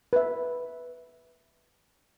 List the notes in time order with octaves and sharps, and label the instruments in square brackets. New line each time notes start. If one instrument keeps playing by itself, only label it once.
[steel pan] B4 E5